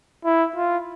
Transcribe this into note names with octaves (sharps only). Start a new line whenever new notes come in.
E4
F4